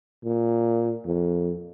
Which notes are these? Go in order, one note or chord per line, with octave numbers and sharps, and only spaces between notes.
A#2
F2